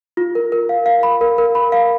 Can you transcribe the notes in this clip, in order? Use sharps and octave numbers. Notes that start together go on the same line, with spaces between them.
F4
A#4
A#4
F5
F5
B5
A#4
A#4
B5
F5